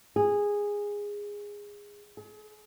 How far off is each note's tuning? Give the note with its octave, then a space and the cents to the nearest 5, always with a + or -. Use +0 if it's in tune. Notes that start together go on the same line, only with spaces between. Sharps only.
G#4 -15
G#4 +40